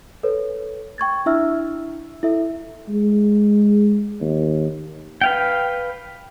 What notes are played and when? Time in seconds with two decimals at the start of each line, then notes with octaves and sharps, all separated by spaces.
0.23 A4 B4 C#5
0.98 G5 C#6 G#6 A6
1.26 D4 E4 E5 E6 F6
2.23 E4 A4 E5
2.89 G#3
4.21 D#2
5.21 B4 F5 G5